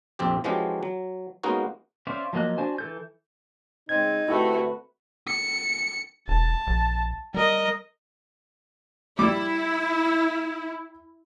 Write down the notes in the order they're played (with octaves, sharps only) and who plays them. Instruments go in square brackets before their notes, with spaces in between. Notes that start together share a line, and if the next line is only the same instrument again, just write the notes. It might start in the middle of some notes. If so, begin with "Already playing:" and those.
[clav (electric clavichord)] A#1 F2 C4 G4
E3 F3 G#3 C#4 F#4 G4
F#3
G#3 A#3 B3 C#4 D#4 F#4
[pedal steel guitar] C#4 C5 D5 E5 F5
F3 F#3 A#3 D#5 F#6
D4 F#4 C5 G#5
E3 A4 G6
[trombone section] C#3 G#3 C4 [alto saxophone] D#4 [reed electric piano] G#6
[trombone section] D3 C4 B4 [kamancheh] A3 F#4 [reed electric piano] E4 G4 E5
[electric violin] C#7
[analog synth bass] E1 [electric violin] A5
[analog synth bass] A#1
[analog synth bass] G3 [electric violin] A#4 D#5
[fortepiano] G3 D6 [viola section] E4